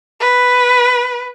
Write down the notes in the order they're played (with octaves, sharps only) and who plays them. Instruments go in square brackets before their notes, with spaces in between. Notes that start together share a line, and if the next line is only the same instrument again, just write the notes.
[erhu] B4